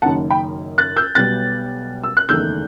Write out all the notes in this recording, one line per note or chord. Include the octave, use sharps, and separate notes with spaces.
F#1 F#2 D#3 F#5 A5
G5 B5
F#6 A6
E6 G6
B1 B2 G3 B3 F#6 A6
E6
F#6
F#1 E2 D#3 A3 E6 G6